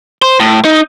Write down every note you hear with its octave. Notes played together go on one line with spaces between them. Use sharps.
C5
A2
D#4